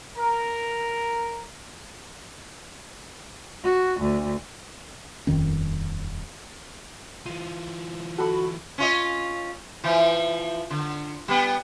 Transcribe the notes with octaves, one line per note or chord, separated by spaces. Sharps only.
A#4
F#4
D2
D#1 F2 D#3 C#4
E3 F4 D#7
F#4 A4 B5
C#4 F4 D#5
E3 F3
D3
G3 B3